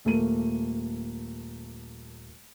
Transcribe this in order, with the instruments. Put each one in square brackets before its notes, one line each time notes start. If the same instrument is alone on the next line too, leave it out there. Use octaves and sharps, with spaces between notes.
[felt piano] D#1 A3 A#3 D#7